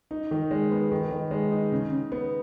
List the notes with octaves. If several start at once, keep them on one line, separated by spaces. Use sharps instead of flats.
D#4
D#3
G#3
B3
D#3
D#3
G#3
D#4
C#3
C#3
B3